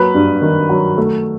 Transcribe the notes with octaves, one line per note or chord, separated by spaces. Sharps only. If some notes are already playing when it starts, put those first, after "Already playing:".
Already playing: F#3 A#3 B4
G2
D#3
F#3
A3